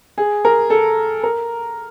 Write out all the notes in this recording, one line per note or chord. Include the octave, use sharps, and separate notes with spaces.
G#4
A#4
A4
A#4